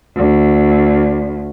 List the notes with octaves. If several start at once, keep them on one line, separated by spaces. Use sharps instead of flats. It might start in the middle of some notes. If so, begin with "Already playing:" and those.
D2